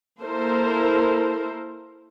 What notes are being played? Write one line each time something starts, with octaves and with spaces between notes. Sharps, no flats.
A#3 E4 A4 A#4 C5